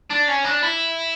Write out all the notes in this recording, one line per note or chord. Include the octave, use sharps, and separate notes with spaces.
D4
C#4
D4
E4